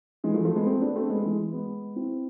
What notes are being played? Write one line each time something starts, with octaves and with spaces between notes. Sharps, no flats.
E3 G#3
F3 A3
F3 A3
G#3 B3
A3 C4
B3 D4
A3 C4
G#3 B3
E3 G#3
G#3 B3
C4 E4